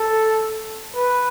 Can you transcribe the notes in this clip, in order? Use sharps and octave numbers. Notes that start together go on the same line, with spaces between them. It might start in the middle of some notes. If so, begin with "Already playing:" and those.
Already playing: A4
B4